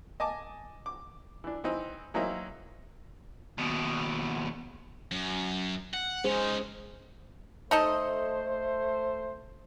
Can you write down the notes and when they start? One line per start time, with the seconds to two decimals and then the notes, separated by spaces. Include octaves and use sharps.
0.20 D#5 G#5 A5 D6
0.86 D6
1.44 E3 D4
1.64 E3 C4 D#4
2.14 E3 F#3 A#3 C4 D#4 E4
3.58 D#2 B2
5.12 F#2
5.93 F#5
6.24 G#3 C#4 D#4 G#4 C5
7.71 A3 D#4 A4 C5 D#5